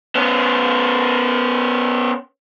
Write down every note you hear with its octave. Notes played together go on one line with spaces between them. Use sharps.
B3 C#4